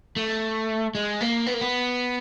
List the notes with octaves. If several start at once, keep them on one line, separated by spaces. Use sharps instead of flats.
A3
G#3
A#3
B3
A#3
B3